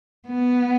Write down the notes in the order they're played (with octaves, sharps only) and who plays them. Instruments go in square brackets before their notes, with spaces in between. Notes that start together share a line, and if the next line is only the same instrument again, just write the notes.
[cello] B3